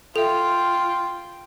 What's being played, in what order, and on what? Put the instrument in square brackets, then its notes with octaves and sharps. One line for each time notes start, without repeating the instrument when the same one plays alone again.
[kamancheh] F4 [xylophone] A4 E5 [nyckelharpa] G5